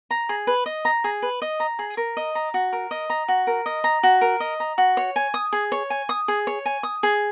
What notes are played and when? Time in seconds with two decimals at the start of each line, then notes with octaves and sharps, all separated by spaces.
0.11 A#5
0.29 G#4
0.47 B4
0.66 D#5
0.85 A#5
1.04 G#4
1.22 B4
1.42 D#5
1.60 A#5
1.79 G#4
1.97 A#4
2.17 D#5
2.35 A#5
2.54 F#4
2.73 A#4
2.91 D#5
3.10 A#5
3.28 F#4
3.47 A#4
3.66 D#5
3.84 A#5
4.03 F#4
4.21 A#4
4.40 D#5
4.60 A#5
4.78 F#4
4.97 C#5
5.16 G#5
5.34 D#6
5.53 G#4
5.72 C#5
5.90 G#5
6.09 D#6
6.28 G#4
6.47 C#5
6.66 G#5
6.83 D#6
7.03 G#4